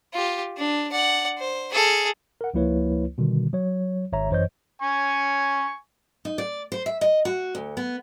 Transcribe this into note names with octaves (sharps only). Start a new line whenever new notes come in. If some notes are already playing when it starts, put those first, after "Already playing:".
F4 G4
D4
D5 F#5
C5
G#4 A4
A#4 F#5
C#2 F3 A#3 E4 B4 C#5
B2 D3 D#3 G3
F#3 C#5
G#1 C#5 E5 A#5
F#2 E3 C5 C#5 D#5 G6
G#5 C#6
D#4
D5
C5
E5
D#5
F#4
D2
B3